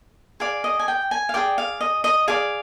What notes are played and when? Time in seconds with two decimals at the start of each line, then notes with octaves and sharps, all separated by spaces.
0.40 G#4 D5 F5
0.64 D#5
0.79 G#5
0.88 G5
1.11 G#5
1.29 F5
1.34 G#4 D5 G5
1.58 F5
1.81 D#5
2.04 D#5
2.28 G#4 D5 F5